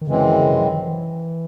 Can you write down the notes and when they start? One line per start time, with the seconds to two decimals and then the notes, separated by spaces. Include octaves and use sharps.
0.01 D#3
0.07 F#2 C#3 E3 G#3 C4
0.17 C#3
0.29 D#3
0.39 C#3
0.51 C3
0.61 F#3
0.72 D#3
0.82 E3